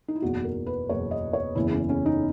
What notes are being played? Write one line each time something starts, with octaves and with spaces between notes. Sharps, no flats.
D#4
E4
F#1 E2 B2 F#4
A#4
B4
F#1 E2 B2 C#5
D#5
C#5
F#1 E2 C#3 E3 E4
C#4
C#4
D#4